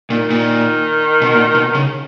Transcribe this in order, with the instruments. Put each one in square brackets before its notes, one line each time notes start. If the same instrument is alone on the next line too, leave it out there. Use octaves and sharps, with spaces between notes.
[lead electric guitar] A#2 [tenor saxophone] D#3
[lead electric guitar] A#2
B2
A#2
B2
C#3